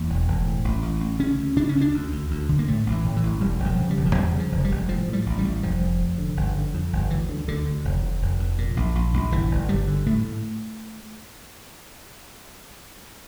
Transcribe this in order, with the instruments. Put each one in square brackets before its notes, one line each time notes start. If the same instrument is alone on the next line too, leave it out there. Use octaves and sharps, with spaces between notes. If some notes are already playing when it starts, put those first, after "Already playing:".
Already playing: [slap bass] E2 A#3
E1
E1
A2
A1
A1
A1
C#3 C#4
D2
C#3 D4
C#4
D2
D4
D2
D2
D2
D3
A#3
A2 A3
A1
E3
A2
E3
A1
E1 G3
E1
F3
C#3
G3
E1
F3
E2 G3
C#3
F3
F1
G3
F1
A2 F3
A2
G3
A1
G3
A1
F1 F3
F1
F1
D3
G1
D3
F2
G1
D2 E3
D3
D2 D3
D2
F1
F2
F1
F2
A#2
A#1
A#1
A#1
G1 E3
G1
G1 G3
D3
A2 A3
A2